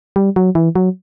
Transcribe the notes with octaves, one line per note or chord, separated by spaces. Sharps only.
G3
F#3
E3
F#3